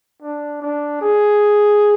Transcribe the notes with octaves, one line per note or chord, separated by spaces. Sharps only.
D4
D4
G#4